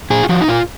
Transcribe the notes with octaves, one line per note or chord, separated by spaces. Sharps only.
A#2 G#4
F4
F3 F#4
D#4
A#2 F4